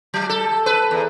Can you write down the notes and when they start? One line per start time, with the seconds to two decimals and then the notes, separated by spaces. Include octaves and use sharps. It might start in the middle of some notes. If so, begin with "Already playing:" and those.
0.14 F#3
0.29 A4
0.66 B4
0.91 E2